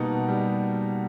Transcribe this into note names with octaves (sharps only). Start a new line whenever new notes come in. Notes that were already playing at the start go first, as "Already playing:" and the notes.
Already playing: B2 G3 A#3 D#4 F#5 A5
G3